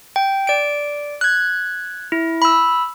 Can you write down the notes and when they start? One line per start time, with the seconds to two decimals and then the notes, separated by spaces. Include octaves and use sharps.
0.16 G5
0.47 D5 D7
1.21 F#6 G#6
2.12 E4
2.42 B5 E6